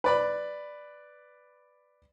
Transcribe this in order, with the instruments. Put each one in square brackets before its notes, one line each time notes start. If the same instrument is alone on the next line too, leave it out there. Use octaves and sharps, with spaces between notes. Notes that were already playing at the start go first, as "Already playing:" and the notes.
[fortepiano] B4 D5 B5